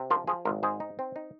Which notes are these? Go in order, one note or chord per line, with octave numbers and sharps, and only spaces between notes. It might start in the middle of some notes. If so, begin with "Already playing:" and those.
Already playing: C3
F3 F4 A#4
F3 G#4
G#1 F4 A#4
G#2 G#4 C5
D#4
C4
D#4